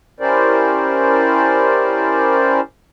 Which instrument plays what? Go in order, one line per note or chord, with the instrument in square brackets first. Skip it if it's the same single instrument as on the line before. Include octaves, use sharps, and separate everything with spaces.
[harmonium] C#4 E4 G4 A#4 C5 D5